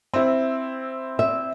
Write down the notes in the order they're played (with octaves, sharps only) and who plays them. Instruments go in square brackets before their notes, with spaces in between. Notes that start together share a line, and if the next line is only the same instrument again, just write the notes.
[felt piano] C4 E4
[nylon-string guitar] E5